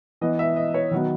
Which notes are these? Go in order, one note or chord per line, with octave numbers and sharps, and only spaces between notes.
E3 B3 D#5
E5
D#5
C#5
D#3 F#3 B3